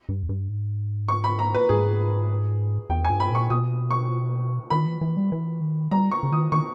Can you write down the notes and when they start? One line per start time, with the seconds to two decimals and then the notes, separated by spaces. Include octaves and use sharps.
0.09 G2
0.23 E2
0.29 G2
0.48 G#2
1.08 C#6
1.24 B5
1.39 A#5
1.54 B4
1.69 G#2 G#4
2.90 E2 G5
3.05 G#5
3.10 G2
3.20 B5
3.30 A#2 C#6
3.50 B2 D#6
3.91 C#6
4.70 D#3 B5
4.86 E3
5.01 E3
5.17 G3
5.32 E3
5.61 D#3
5.91 G3 A#5
6.11 C#6
6.23 C#3
6.32 D#3 D#6
6.52 D#3 C#6